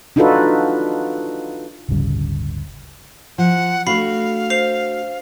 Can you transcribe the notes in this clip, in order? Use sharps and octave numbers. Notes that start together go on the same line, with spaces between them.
D4 D#4 F4 F#4 A4 B4
D1 G1 C#3 G3
F3 F#5
A3 D4 F#4 F5 B5 C7
C5 C7 F7